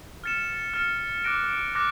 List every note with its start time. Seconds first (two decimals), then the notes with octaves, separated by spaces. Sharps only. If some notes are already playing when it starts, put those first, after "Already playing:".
0.24 F6 A6 C#7 E7
0.74 F6 A6 C#7 E7
1.24 D6 F#6 A#6 D7
1.75 D6 F#6 A#6